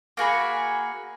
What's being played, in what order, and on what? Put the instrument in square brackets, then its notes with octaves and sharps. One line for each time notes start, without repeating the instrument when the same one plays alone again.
[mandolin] A#3 F#4 G#4 B5